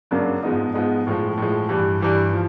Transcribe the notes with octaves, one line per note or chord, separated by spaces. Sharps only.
F#2 C#3 F#3 A#3 D4
G#2 F3 G#3 B3 D#4
G#2 F3 G#3 B3 D#4
A2 F3 G#3
A2 F3 G#3
G2 E3 G3
G2 E3 G3
F3